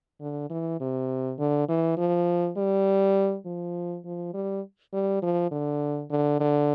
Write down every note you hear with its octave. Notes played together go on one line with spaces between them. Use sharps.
D3
E3
C3
D3
E3
F3
G3
F3
F3
G3
G3
F3
D3
D3
D3